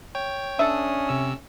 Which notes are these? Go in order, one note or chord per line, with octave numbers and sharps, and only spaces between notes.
C#5 G5
C#4 D4 A4 E5 D#6
C3 E6